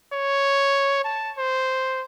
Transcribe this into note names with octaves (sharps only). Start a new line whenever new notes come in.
C#5
A5
C5